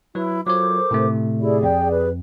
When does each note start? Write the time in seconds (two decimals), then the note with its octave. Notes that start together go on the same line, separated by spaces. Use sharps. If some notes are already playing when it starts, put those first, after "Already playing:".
0.15 F#3 E4 B4
0.46 F#3 F4 A4 A#4 C5 C#5 D6
0.91 A2 C3 A3
1.40 E4 G4 G#4 D5
1.63 F2 G5
1.91 B4